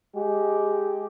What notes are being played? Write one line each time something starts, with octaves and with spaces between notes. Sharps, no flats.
G#3 G4